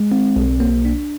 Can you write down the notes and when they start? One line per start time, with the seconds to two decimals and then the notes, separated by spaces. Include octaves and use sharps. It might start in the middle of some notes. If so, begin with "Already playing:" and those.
Already playing: G#3
0.12 C4
0.36 B1
0.60 A#3
0.85 D4